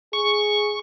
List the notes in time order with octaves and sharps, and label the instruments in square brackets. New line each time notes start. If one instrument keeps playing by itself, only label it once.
[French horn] G#4 [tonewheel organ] C#6